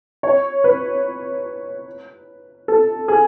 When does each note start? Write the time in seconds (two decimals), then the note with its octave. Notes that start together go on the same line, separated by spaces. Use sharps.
0.23 C#5
0.64 B4
2.68 A4
3.08 G#4